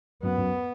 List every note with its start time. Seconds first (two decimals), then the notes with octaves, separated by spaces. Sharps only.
0.23 F#2 B3
0.38 F#2